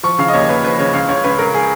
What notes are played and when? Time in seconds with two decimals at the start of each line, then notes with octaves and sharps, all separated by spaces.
0.03 F3 C#6
0.18 C#3 F5
0.28 D#5
0.33 D#2 C#5
0.44 C#5
0.49 D#2 B4
0.63 F3 B4
0.79 C#3 C#5
0.94 C#2 F5
1.08 C#2 C#5
1.24 C#2 B4
1.39 C#2 A#4
1.54 G#4